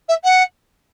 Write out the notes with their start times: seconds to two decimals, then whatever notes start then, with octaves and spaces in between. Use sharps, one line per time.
0.08 E5
0.24 F#5